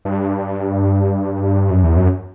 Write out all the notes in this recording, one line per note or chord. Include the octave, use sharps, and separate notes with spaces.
G2
F#2
E2
F#2